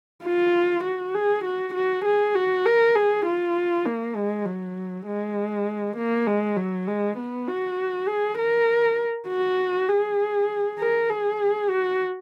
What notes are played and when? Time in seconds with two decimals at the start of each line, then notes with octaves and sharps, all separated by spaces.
0.25 F4
0.84 F#4
1.14 G#4
1.45 F#4
1.74 F#4
2.05 G#4
2.35 F#4
2.66 A#4
2.96 G#4
3.26 F4
3.85 A#3
4.15 G#3
4.46 F#3
5.06 G#3
5.97 A#3
6.27 G#3
6.57 F#3
6.88 G#3
7.18 B3
7.48 F#4
8.08 G#4
8.38 A#4
9.28 F#4
9.89 G#4
10.79 A#4
11.10 G#4
11.70 F#4